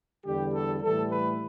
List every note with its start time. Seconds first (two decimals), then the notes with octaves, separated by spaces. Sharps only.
0.25 E2 D3 G3 G4
0.54 A4
0.83 A2 E3 G3 A4
1.11 B4